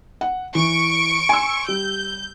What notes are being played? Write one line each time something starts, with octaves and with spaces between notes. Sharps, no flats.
F#5
E3 C#6 D7
G#5 C6 E6
G3 G6